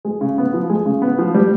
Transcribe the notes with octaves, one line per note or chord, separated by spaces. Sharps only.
G#3
C#3
B3
F3
G#3
C#3
B3
F3
G3